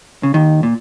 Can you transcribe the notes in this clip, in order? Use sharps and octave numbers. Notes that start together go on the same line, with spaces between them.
C#3
D#2 D#3
A#2